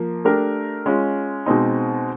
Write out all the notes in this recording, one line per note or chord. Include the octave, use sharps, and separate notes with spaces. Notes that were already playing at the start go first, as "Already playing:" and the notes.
Already playing: F3 A#3
A3 D4 G4 A#4
G#3 C#4 F4
B2 G#3 C4 D#4